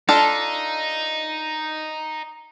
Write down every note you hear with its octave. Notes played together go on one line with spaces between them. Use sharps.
D4 D#4 F4 A4